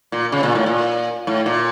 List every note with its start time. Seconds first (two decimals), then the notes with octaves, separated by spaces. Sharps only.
0.12 A#2
0.32 C#3
0.43 A#2
0.55 A2
0.66 A#2
1.27 A2
1.46 A#2